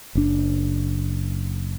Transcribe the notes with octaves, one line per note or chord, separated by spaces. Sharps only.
F#1 D4